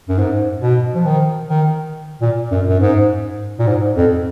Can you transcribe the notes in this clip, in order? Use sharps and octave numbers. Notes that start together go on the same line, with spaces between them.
F#2
G#2
B2
F3
D#3
D#3
A#2
F#2
F#2
G#2
A#2
G#2
F2